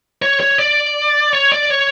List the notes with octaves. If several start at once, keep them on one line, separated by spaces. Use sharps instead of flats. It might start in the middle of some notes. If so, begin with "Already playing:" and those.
C#5
C#5
D5
C#5
D5
C#5